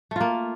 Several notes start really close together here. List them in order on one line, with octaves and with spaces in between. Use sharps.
A3 F4 A#3